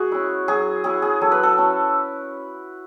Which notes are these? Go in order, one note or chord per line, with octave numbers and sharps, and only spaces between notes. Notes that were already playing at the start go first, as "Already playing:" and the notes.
Already playing: G#3 F#4 G#4
C#4 E4
F#3 G#4
C#4 E4 G#4
G#4
F#3 A4
B4
A4
C#4 E4